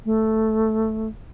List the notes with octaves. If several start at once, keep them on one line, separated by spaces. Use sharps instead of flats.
A3